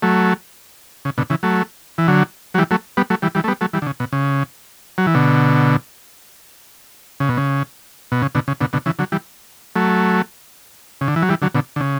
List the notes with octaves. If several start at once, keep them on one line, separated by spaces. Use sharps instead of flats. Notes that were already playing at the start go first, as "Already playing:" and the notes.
F#3 A3
C#3
B2 D3
C#3 E3
F#3 A3
E3
D3 F#3
F#3
E3 G3
F#3 A3
G3 B3
F#3 A3
E3 G3
E3 G3
A3
G3 B3
F#3 A3
E3 G3
D3
C#3
B2
C#3
F#3
E3
B2 D3
C#3
B2
C#3
B2
C#3
B2 D3
C#3
B2 D3
B2 D3
C#3 E3
D3 F#3
E3 G3
F#3 A3
C#3
D3
E3
F#3
E3 G3
D3 F#3
B2 D3
D3
C#3